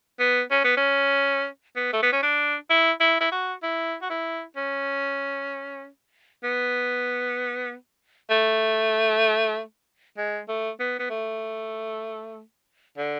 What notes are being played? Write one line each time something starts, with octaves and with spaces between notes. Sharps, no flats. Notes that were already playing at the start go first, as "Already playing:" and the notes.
B3
C#4
B3
C#4
B3
A3
B3
C#4
D4
E4
E4
E4
F#4
E4
F#4
E4
C#4
B3
A3
G#3
A3
B3
B3
A3
D3